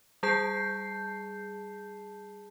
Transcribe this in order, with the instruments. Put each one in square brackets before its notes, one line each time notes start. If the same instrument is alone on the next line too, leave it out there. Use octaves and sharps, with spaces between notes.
[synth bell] G3 G#4 A5 G6 C7